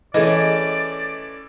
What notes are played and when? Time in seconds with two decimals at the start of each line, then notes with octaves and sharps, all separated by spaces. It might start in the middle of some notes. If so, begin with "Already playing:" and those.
0.14 E3 A3 C#4 G#4 D5 D#5